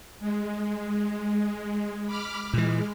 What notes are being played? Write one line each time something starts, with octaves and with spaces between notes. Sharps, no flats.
G#3
B5 D6 F6
A#2 E3 G#3